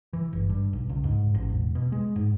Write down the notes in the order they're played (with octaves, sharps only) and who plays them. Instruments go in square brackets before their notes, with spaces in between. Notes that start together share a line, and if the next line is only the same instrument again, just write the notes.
[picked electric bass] E3
G1
G2
B1
C#2
G#2
A1
E1
B2
G#3
G#2